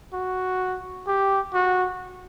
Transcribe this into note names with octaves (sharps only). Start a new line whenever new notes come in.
F#4
G4
F#4